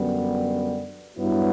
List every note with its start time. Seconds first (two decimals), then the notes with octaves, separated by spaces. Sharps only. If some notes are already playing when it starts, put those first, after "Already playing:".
Already playing: F#2 D3 G3 B3
1.17 G2 F#3 B3 E4